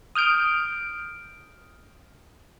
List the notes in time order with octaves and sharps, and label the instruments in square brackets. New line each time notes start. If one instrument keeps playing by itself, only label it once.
[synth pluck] D#6 F6 G6 D7